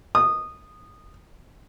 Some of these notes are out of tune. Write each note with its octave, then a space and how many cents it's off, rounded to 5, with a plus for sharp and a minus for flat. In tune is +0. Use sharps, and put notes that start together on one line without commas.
D#6 -15